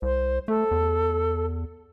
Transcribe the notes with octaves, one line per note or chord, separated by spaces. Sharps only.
C2 C5
A3 A4
E2